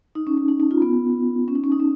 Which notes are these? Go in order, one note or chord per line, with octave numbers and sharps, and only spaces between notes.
D#4
C#4
C#4
D#4
D#4
F4
B3
C#4
D#4
C#4
D#4
C#4